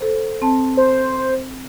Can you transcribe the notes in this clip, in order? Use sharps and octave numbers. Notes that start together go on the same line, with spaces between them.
A4 C5
C4 A5
C5